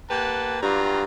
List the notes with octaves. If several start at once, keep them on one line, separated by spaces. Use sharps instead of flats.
A#3 G4 B4 F#5 G5 A5
G2 F#3 G3 F4 G4 A#5